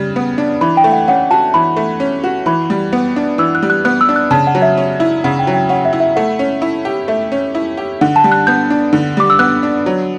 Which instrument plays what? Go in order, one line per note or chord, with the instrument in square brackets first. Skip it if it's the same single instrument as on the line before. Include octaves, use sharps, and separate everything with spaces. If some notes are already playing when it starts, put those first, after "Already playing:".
Already playing: [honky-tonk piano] C#3 G3
B3
D4
[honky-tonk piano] E3 [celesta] B5
[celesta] G5
[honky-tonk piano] A3
[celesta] F#5
[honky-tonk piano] C#4 [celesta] F#5
[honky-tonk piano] F#4 [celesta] A5
[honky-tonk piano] E3 [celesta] B5
[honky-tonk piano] A3
C#4
F#4
[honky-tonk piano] E3 [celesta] B5
[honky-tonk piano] G3
B3
D4
[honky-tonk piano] E3 [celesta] E6
[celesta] F#6
[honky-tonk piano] G3
[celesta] F#6
[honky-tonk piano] B3 [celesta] F#6
[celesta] E6
[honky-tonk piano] D4
[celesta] F#6
[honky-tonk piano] C#3 [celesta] A5
[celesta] F#5
[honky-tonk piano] F#3
[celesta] E5
[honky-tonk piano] C#4
E4
[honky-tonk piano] C#3 [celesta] F#5
[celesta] G5
[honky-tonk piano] F#3
[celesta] G5
[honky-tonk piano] C#4 [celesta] F#5
[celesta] E5
[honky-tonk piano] E4
[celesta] E5
[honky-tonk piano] A3 [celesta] F#5
[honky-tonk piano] C#4
E4
G4
[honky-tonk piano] A3 [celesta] E5
[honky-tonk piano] C#4
E4
G4
[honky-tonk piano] D3 [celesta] F#5
[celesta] A5
[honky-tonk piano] G3
[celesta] F#6
[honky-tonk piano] B3 [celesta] G6
[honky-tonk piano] D4
D3
[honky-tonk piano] G3 [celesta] D6
[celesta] E6
[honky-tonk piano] B3 [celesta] F#6
[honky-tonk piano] D4
F#3